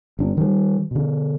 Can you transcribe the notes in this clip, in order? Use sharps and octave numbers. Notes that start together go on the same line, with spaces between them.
G1 D4
D#3 G3
B2 D3